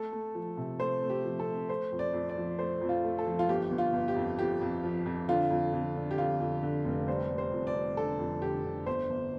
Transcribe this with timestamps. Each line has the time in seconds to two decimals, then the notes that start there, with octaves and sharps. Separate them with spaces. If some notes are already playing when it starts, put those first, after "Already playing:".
Already playing: A3 A4
0.12 A3
0.35 F3
0.57 C3
0.80 A3 C5
1.02 A3
1.10 G4
1.25 F3
1.40 A4
1.47 A3
1.69 A3 C5
1.92 F2
1.99 D5
2.14 F2
2.29 D5
2.37 F3
2.59 A3 C5
2.81 F2
2.89 F4
3.04 A3
3.19 A4
3.27 F3
3.39 F4
3.49 G1 G4
3.71 G1
3.78 F4
3.93 G1
4.08 G4
4.16 F2
4.39 F2 G4
4.61 F2
4.84 F3
5.06 F2
5.28 D3 F4
5.51 F2
5.73 F2
5.96 D3
6.11 G4
6.18 F2 F4
6.40 F2
6.63 D3
6.85 F1
7.08 G3 C5
7.31 G3
7.38 C5
7.52 F2
7.67 D5
7.75 G3
7.97 D3 A4
8.19 F2
8.42 D3 G4
8.64 D3
8.86 G1 C5
9.10 G1